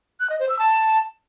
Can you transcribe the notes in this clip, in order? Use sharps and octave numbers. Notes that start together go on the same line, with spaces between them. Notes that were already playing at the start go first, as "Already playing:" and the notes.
F#6
D#5
C5
E6
A5